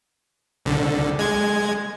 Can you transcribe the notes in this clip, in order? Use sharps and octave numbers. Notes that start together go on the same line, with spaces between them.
C2 D3
G#3 G#6